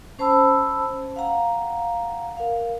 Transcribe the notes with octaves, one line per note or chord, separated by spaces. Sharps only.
C#4 C5 A5 B5 E6
F5 F#5 A#5
A#4 F5